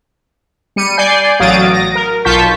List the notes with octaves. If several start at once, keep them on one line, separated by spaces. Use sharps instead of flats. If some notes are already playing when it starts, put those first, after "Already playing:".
G3 C#7 D#7
D5 G#5 G6 C7
A1 F#3 F5 D#6 A6 D7
A#6
A#4
B1 F4 A5 C#6 G6 B6